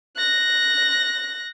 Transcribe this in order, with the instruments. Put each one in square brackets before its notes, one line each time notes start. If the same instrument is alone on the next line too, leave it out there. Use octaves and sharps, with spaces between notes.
[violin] F#6 A#6